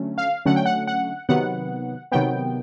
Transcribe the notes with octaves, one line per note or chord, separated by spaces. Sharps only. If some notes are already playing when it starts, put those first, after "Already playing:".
Already playing: D3 F#3 A3 C#4
F5
D3 F#3 A3 C#4 F#5
G5
F#5
F#5
C3 D#3 F#3 B3 F#5
C3 D#3 F#3 B3 G5